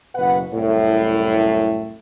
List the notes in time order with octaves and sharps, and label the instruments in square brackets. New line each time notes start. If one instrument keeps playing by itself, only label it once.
[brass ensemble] F#1 B2 B4 F#5
C2 F#2 A2